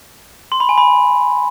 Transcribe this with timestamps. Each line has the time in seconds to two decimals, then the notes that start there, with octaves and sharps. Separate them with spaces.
0.52 C6
0.60 B5
0.69 G#5
0.78 B5